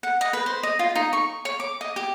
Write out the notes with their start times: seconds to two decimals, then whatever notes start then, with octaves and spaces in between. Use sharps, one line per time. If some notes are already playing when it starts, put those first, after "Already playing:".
0.03 F#5
0.21 D#5
0.33 B4
0.46 C5
0.63 D#5
0.79 F4
0.96 D#4
1.13 C#6
1.45 C#5
1.60 D6
1.81 D#5
1.96 G4